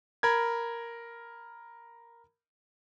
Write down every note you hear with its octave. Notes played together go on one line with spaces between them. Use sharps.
A#4 B5 G#6